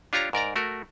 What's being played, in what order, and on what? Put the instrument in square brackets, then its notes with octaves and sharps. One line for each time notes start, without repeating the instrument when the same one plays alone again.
[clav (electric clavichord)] D4 F4 G4 C#5 A#5
G#2 A#4 D5 A#5
A3 F#4 A#4